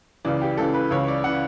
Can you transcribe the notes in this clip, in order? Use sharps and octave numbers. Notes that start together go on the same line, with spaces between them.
C#2 C#3 E3 D5
G4
C#2 C#3 E3 A4
B4
C#2 C#3 E3 C#5
D5
C#3 E3 F#5